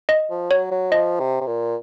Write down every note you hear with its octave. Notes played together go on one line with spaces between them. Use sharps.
D#5
F3
F#3 C#5
F#3
F3 D#5
C3
C3
A#2